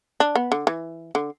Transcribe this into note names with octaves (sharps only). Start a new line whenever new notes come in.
D4
B3
D3
E3
D3